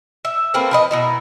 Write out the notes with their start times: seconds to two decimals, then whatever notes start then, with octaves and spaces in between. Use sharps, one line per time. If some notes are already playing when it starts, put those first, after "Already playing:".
0.25 E5
0.54 A3 A#3 C4 B4
0.71 F3 B4 D#5
0.91 B2 D#4 E4